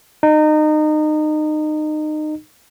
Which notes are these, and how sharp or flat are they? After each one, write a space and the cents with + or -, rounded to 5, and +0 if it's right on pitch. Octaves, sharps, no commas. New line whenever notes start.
D#4 -25